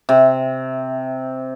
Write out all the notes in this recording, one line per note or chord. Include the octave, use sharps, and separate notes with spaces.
C3